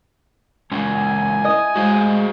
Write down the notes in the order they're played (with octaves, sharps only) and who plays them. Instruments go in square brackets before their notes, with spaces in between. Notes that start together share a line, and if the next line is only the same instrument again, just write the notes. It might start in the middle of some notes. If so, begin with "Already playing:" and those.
[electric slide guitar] G#3 A#3 C#4 [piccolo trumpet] G#5
[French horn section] E4 [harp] D#5
[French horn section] G#3 [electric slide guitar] F#4 C5 F5